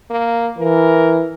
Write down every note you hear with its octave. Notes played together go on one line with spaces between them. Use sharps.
A#3
E3 A#4